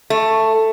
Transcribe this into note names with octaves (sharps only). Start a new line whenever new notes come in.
A3